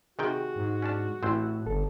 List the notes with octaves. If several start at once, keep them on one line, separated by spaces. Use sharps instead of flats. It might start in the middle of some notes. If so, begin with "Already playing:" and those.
C3 D#3 F#4 G#4 G5
G#2
C#4 D4 A5
A1 A2 C4 C5 E6
G1 A4